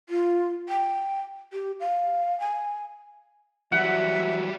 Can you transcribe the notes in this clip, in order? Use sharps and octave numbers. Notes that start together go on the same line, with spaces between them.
F4
G5
G4
F5
G#5
E3 F#3 G3 F#4 E5 F#5